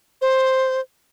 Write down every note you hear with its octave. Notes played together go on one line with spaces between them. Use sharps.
C5